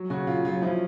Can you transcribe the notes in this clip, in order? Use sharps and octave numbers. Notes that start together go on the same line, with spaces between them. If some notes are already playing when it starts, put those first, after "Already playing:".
Already playing: F#3
C#3 F#4
C#3 F4
F#3 F4
F3 E4